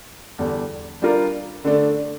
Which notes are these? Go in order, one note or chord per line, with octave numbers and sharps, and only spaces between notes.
E2 D3 G3 D4 A4
G3 D4 F4 A#4 D5
D3 A3 D4